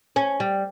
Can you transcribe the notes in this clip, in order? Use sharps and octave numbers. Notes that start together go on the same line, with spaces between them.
C#4
G3